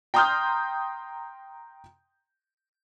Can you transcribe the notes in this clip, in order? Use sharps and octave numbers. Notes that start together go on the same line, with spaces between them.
G5 A#5 C6 D#6 F6 G6